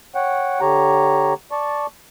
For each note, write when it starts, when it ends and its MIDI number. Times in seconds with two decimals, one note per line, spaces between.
0.15 0.61 73
0.15 0.61 78
0.15 0.61 79
0.61 1.34 50
0.61 1.34 67
0.61 1.34 73
0.61 1.34 82
1.51 1.86 74
1.51 1.86 81
1.51 1.86 85